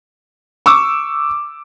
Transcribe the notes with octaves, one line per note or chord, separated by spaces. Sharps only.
C#6 D6 E6